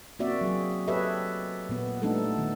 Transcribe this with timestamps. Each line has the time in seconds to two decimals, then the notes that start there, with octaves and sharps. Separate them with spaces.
0.19 A#3 C4 F#4 D5 E5
0.41 F#3 G#4
0.87 G4 A4 B4 C#5 D#5 E5
1.69 A#2 B3
2.02 G3 A3 B3 D4 D#4 A4
2.38 D#3